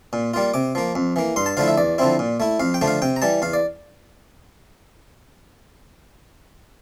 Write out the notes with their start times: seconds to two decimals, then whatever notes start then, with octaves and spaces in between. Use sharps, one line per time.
0.13 A#2
0.34 G3 A#3 F4
0.54 C3 D6
0.75 F3 A#3
0.95 F2
1.16 E3 A#3
1.36 G2 C6
1.46 A5
1.57 D3 F3 A3 E4 F5
1.68 E5
1.78 E2 D5
1.98 D3 F3 C4 E4
2.19 A#2
2.40 A3 E4
2.60 F2 F5
2.74 G5
2.81 D3 F3 A3 D4
2.87 F5
3.02 C3 G5
3.16 A#5
3.22 E3 G3 A5
3.42 E2 F5
3.53 D5